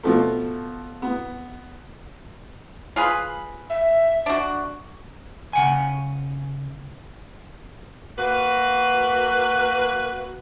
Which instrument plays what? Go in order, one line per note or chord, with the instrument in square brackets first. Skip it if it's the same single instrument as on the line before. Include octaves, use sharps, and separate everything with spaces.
[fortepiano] B2 F3 A3
B3
[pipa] F4 G#4 B4
[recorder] E5
[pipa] D4 F#4
[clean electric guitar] C#3 F#5 G#5
[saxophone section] A#3 B4 [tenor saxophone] F#4